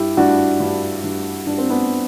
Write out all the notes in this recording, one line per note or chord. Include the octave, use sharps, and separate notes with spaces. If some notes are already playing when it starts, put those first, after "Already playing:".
Already playing: G2 E4 G4
G2 D4 F#4
G2
G2
G2 D4
C4
B3 D4